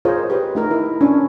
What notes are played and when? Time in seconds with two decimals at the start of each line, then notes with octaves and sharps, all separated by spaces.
0.05 F4 G#4 A#4 C5 C#5 D#5
0.30 G4 B4
0.55 A3 D#4 A#4
0.71 E4
1.01 C#4 D4